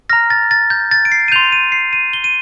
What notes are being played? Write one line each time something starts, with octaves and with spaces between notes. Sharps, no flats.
A#5 F6 A#6
A6
A6
G6
A6
D7
C7
D#7
C6 G6 F7
D#7
C7
D#7
G7
D#7